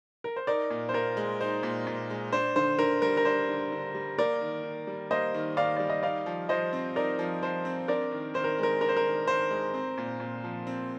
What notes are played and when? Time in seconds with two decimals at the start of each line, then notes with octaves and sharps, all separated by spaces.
0.24 A#4
0.36 C5
0.47 D#4 A#4 D5
0.70 A#2
0.89 C5
0.94 A#2 A#4
1.17 G#3
1.40 D#4 C5
1.63 A#2
1.87 A#2
2.10 G#3
2.32 D4 C5
2.56 D3 C5
2.79 D3 A#4
3.02 G3 A#4
3.17 A#4
3.25 D4 C5
3.49 D3
3.72 D3
3.95 G3
4.18 A#3 A#4 D5
4.41 D#3
4.64 D#3
4.87 G3
5.11 A#3 C5 D#5
5.34 D#3
5.57 D#3 D5 F5
5.76 G3 D5
5.90 D#5
6.03 D#4 D5 F5
6.26 F3
6.49 F3 C5 D#5
6.73 C4
6.96 D#4 A#4 D5
7.19 F3
7.43 F3 C5
7.65 C4
7.88 D4 A#4 D5
8.11 D#3
8.34 D#3 C5
8.44 A#4
8.59 G#3 A#4
8.81 D4 A#4
8.89 C5
8.97 A#4
9.04 D#3
9.27 D#3 C5
9.50 G#3
9.74 C4
9.98 A#2
10.20 A#2
10.44 F3
10.67 C4